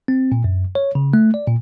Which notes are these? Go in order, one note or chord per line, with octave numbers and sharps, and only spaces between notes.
C4
A#2
F#2
C#5
C#3
A3
D5
A#2